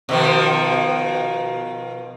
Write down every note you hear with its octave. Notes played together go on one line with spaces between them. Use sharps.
B2 D#3 F3